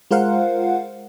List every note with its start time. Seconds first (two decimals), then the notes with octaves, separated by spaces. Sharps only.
0.11 G#3 F4 A#4 C5 F5 F#5